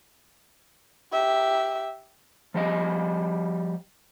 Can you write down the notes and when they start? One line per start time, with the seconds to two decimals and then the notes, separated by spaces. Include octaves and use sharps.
1.12 G4 E5
2.54 F3 G3 G4 D#5